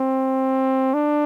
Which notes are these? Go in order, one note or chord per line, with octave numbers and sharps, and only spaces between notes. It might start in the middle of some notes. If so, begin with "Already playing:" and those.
Already playing: C4
D4